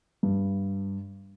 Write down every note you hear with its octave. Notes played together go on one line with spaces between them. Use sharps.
G2